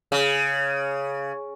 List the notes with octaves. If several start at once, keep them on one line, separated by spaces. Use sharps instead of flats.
C#3